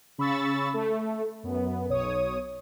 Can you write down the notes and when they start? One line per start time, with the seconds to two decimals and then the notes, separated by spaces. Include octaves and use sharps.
0.18 C#3 B5 C#6 E6 A6
0.74 A3
1.43 F#2 B3
1.89 B1 C#5 D#6